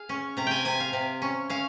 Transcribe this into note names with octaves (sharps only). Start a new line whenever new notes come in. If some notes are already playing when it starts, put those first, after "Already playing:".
Already playing: G#4 F5
C#4
C3 A#5
G5 G#5
C3 G#5
F5
C3
C#4
C#4 F5